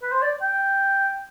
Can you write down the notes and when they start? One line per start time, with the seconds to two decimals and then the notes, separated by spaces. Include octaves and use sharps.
0.02 B4
0.11 C5
0.22 D5
0.42 G5